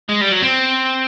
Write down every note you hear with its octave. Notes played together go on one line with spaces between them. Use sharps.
G#3
G3
F#3
C4